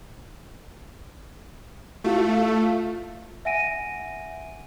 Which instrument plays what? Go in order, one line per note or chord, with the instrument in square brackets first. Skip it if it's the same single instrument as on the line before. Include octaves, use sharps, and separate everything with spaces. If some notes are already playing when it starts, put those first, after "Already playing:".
[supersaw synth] A3 [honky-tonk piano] E4 F4
[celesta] E5 F#5 G#5 A#6 D7 D#7